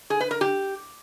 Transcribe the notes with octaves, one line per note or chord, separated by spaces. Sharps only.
G#4
B4
A#4
G4